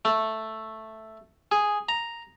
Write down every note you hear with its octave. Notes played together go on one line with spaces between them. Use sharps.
A3
G#4
A#5